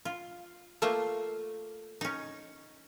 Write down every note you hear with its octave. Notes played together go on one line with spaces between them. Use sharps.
F4
A3 A#3 F4 C5
C#4 D#4